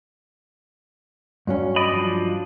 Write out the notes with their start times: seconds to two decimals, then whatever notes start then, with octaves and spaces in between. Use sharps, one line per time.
1.47 G2 F#3 C#4
1.76 D5 D#5 B5
1.93 F3 D4